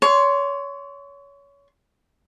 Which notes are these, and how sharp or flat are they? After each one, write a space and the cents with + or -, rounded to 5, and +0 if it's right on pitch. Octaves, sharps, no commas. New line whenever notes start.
C#5 +25 C6 +0